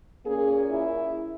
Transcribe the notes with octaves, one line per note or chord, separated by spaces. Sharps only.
A#2 A#3 C#4 G#4
E4